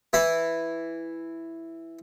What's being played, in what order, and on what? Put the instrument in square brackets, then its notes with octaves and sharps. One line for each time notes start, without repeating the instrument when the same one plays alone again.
[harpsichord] E3 E4 B5